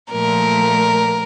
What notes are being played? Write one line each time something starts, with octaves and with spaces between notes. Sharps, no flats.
A#2 F3 A3 A#4